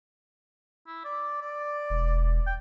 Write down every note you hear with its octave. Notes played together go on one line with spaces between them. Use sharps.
E4
D5
D5
E1
G5